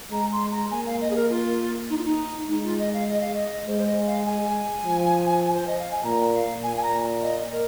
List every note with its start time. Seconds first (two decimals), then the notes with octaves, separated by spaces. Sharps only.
0.12 G#3 A#5
0.31 C6
0.51 A#5
0.71 A#3 G#5
0.86 F5
1.00 D#5
1.10 G#4
1.15 A#4
1.30 F4
1.89 D#4
1.97 F4
2.05 D#4
2.48 G#3 D#4
2.64 F4
2.78 D#5
2.93 F5
3.08 D#5
3.21 F5
3.34 D#5
3.66 G#3 C5
3.78 C5
3.86 D#5
4.06 F5
4.26 G#5
4.85 F3
5.54 C5
5.67 D#5
5.79 F5
5.91 G#5
6.04 A#2 A#5
6.33 F5
6.63 A#2 G#5
6.77 G#5
6.83 A#5
7.22 D#5
7.51 A#4